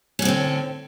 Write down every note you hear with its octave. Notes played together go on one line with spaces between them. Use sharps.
A2 D3 C4 C#4